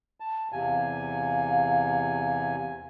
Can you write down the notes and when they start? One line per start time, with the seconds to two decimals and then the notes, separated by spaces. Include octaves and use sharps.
0.20 A5
0.52 E2 C3 F5 G#5